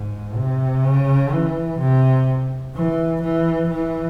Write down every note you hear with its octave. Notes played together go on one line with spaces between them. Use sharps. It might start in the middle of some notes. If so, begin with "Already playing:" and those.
Already playing: G#2
C3
C#3
E3
C3
E3
E3
E3